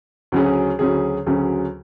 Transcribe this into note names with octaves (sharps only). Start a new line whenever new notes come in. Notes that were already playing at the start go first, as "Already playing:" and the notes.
D2 C#3 F#3 C#4 G#4
D2 C#3 F#3 C#4 G#4
D2 C#3 F#3 C#4 G#4